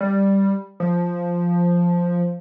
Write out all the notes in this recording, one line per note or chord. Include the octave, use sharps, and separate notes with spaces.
G3
F3